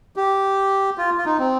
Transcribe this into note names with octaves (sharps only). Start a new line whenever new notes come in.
G4
F4
F4
D#4
C4